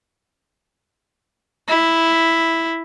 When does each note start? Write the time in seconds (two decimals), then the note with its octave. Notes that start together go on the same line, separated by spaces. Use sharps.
1.68 E4